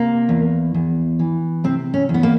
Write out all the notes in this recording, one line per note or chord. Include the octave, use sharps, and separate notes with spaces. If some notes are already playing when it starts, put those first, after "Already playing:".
Already playing: C3 A#3
E2
E2
E3
C3 C4
C#4
E2
B3
A#3